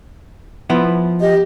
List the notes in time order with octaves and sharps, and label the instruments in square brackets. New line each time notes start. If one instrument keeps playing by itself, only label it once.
[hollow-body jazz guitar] F3 B3 E4
[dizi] G4 [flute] D#5